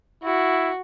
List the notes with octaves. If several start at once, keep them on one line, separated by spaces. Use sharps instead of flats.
E4 F#4